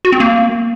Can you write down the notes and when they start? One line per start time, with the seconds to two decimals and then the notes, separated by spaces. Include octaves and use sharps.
0.05 F#4
0.12 C4
0.20 A#3